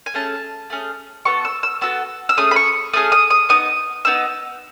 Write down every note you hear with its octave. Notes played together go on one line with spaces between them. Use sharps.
G#5
A3 C#4 G#4 A5
A3 C#4 G#4
B3 F#4 A4 C#6
E6
E6
B3 F#4 A4 E6
E6
A3 C#4 G#4 D#6
B5
C#6
A3 C#4 G#4 D#6
D#6
D#6
B3 D#4 D#6
B3 D#4 E6